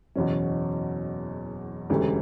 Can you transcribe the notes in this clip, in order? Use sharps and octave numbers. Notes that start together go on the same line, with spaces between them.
F#1 E2 B2 C#4
E1 D2 C#3 E3 G4